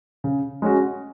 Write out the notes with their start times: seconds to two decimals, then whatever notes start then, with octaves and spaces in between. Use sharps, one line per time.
0.24 C#3
0.62 G#3 C#4 F#4